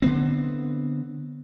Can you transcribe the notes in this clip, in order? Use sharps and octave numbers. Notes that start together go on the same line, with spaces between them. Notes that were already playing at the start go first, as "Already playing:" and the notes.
D3 B3 C4